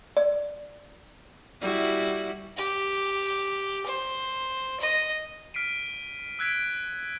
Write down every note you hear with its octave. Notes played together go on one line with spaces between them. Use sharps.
D5
G3 E4 F#4
G4
C5
D#5
F6 B6 C7 D7 D#7
E6 F#6 G#6 B6 D7